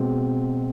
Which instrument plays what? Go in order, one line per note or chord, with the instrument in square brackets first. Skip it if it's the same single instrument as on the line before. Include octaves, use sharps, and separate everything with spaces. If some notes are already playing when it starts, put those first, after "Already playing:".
Already playing: [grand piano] B2 G#3 C4